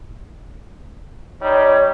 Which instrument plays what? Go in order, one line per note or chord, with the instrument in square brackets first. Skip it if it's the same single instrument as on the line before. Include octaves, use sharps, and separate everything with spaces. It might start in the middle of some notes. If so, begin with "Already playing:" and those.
[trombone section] G3 D#4 [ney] C#5